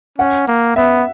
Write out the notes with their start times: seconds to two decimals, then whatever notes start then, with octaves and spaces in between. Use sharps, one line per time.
0.18 C#4 F#5
0.48 A#3
0.76 B3 E5